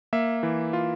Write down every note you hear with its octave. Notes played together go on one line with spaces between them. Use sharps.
A#3 E5
E3
F4